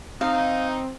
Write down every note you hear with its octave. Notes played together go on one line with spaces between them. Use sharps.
C4 D#4 F5